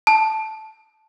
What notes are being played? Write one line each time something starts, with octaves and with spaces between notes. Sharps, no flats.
A5